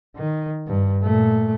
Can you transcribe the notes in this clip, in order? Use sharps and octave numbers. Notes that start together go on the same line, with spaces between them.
D#3
G2
A#2 A3